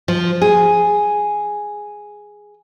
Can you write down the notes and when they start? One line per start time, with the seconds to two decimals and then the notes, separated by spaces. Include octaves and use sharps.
0.08 F3
0.42 G#4